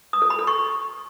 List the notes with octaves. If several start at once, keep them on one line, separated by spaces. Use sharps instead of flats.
D#6
A4
B5
A4
C#6